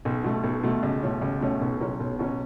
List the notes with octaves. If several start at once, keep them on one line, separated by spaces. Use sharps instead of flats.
B1
B2 A3
B1
B2 A3
C#2
B2 A3 C#4
C#2
B2 A3 C#4
B1
B2 F#3 C#4
B1
B2 F#3 C#4